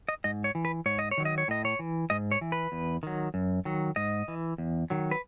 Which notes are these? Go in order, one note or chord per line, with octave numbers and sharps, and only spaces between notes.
D#5
G#2 D#5
C#5
E3
B4
G#2 C#5
D#5
C#5
D#3 F#3
D#5
C#5
A2 D#5
C#5
E3
G#2 D#5
C#5
E3
B4
E2
D#3 F#3
F#2
D#3 F#3
G#2 D#5
E3
E2
D#3 F#3
B4